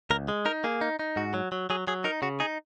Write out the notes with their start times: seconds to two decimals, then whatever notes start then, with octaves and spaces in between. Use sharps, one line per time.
0.10 C#2 A#4
0.28 G#3
0.45 D#4 A#4
0.64 A#3 G#4
0.81 D#4
0.99 D#4
1.16 G#2 F#4
1.34 F#3
1.52 F#3
1.70 F#3 G#4
1.87 F#3 G#4
2.04 D#4 A#4
2.22 C#3 F#4
2.40 D#4 G#4